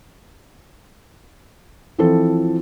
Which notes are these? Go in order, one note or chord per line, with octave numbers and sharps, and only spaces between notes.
E3 F3 C4 F4 A4